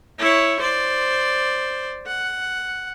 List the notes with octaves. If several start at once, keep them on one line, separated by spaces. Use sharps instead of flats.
E4 C#5
C5 D5
F#5